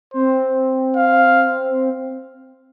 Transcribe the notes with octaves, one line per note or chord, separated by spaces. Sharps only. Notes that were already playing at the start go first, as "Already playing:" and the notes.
C4 C5
F5